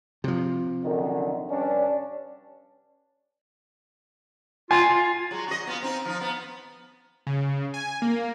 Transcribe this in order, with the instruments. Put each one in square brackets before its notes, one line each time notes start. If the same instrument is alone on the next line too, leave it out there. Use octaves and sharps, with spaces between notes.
[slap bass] C3 F3
[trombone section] F#2 D3 D#3
G2 C#4 D4
[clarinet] F4 [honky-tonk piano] G#5
[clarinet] F4
[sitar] F#3 G#3
F#4 D#5
B3 F4
C4 D#4
F3 D#4
B3
[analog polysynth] C#3
G#5
A#3